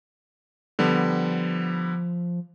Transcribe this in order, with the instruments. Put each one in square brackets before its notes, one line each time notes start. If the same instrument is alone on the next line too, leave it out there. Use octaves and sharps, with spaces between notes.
[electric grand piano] D3 G3 B3 [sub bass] F3